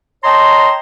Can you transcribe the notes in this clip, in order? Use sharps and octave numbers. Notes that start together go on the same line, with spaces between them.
C#5 D#5 G5 A5 A#5 C6